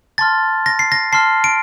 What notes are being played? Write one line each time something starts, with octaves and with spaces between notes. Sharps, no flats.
A5 C6 F6 A6
A#6
C7
A#6
A5 C6 F6 C7
D7